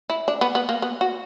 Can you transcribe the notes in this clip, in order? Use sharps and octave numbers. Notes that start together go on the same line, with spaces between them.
E4
D4
B3
B3
A#3
B3
F#4